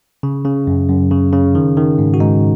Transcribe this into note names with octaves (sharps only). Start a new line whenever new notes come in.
C#3
C#3
F#2
F#2
C#3
C#3
D#3
D#3
G#2
F#4
G#2 D#4